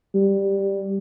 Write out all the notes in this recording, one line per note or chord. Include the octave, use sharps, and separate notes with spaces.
G3